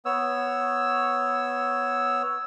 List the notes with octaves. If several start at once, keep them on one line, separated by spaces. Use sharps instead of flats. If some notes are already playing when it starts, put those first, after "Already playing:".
B3 C#5 E6